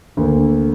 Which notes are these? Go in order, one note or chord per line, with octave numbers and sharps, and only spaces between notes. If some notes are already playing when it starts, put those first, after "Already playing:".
D2 D3 A#3